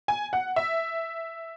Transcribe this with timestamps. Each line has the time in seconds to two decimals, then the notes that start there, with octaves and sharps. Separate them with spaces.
0.08 G#5
0.33 F#5
0.56 E5